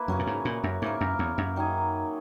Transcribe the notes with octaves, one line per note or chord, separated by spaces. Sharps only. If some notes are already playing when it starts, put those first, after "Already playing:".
Already playing: A#3 E4 B4
F#2 C#3 F#3 C#4
A#2
G#2
A#2
F#2
G#2 A#3 E4 A#4
F#2
E2
F#2
D#3 F#3 C#4 G#4